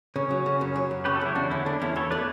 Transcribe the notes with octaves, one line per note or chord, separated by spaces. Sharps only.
C#3 C#4
F#3
C#3
F#2
F#3
F#2
C#3 G4 B4
F#4 A4
C#3 E4 G4
E2 D4 F#4
D3 C#4 E4
A3 D4
E2 C#4 E4
E2 A4 C#5
A3 B4 D5